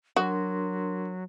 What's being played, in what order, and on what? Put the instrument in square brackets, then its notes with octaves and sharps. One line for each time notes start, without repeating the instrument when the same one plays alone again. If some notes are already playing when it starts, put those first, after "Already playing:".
[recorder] F#3 [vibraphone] D4 A#4 C6 [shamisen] F#4